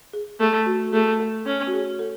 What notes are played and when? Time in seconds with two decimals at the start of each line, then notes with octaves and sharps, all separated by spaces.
0.13 G#4
0.40 A3 G#4
0.66 F#4
0.93 A3 G#4
1.20 A4
1.46 C#4
1.67 F#4
1.73 G#4
1.99 A4